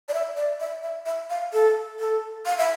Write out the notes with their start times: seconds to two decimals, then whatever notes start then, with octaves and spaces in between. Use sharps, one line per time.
0.08 D5
0.14 E5
0.37 D5
0.60 E5
0.83 E5
1.06 E5
1.30 F5
1.53 A4
2.00 A4
2.46 F5
2.58 E5